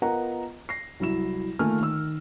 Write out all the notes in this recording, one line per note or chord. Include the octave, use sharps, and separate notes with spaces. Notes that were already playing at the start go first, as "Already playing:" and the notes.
B3 F4 A#4 D#5 F#5 A#5
A#6 C7
C2 F#3 E4 E7
D#3 A3 A#3 F4 G#5 F6
D#3 E6